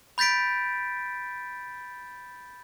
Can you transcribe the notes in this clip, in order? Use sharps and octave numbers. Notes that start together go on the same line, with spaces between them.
B5 G6 A6 B6 D7